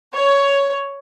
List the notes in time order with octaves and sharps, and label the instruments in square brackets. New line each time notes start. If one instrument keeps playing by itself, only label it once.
[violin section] C#5